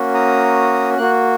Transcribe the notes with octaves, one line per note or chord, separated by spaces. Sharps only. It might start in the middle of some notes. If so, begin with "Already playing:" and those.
Already playing: A#3 C#4 F#4
A#5 D#6
A#3 F#4 F#6